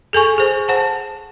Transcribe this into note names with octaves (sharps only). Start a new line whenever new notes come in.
G#4 A4 G#5 C#6
G#4 C5
C5 F#5 A5